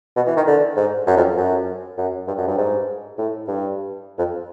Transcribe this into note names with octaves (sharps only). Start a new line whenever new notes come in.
B2
E3
D#3
D3
G#2
F#2
F2
F#2
F#2
G2
F#2
G2
G#2
A2
G2
F2